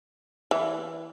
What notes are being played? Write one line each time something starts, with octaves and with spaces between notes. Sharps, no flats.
E3